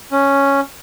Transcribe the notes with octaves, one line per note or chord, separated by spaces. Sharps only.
C#4